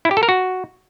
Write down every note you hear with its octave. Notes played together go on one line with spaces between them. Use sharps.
E4
G4
A4
A#4
F#4